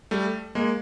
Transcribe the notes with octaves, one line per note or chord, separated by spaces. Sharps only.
G3 A3
G#3 A#3